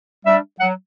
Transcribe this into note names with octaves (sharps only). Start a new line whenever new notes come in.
G3 D4 E5
F#3 F#5